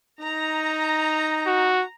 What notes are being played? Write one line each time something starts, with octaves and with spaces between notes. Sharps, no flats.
D#4 A#5
F#4